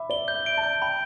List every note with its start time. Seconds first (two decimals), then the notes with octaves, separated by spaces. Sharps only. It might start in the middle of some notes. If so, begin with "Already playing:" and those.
Already playing: E5 B5 D6
0.10 D5 G7
0.28 G6
0.34 E5
0.46 D7
0.57 A5
0.63 G6
0.82 G5 B5